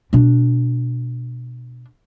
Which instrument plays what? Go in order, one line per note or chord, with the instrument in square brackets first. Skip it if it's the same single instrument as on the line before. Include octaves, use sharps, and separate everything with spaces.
[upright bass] B2 D4